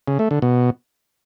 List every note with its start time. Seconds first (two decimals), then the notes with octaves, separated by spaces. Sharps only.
0.08 C#3
0.19 A3
0.31 D3
0.42 B2